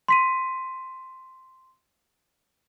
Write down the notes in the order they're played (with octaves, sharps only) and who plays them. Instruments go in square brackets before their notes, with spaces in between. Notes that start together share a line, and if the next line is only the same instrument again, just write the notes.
[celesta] C6 B6 D#7